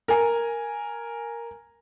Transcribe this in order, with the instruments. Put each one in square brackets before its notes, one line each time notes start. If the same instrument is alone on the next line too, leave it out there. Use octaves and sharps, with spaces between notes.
[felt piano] A#4 G#5